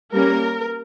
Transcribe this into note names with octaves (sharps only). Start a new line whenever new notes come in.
G3 A#3 C#4 A#4